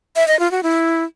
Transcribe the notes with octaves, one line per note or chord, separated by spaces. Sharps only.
E5
D#5
F4
F#4
E4